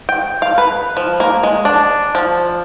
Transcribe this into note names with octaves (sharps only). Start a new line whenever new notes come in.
G5
F5
B4
F3
A#3
G#3
D4
F3